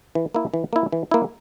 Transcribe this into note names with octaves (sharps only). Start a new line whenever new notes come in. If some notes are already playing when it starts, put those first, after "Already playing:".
E3
A#3 E4
E3
A#3 E4
E3
A#3 E4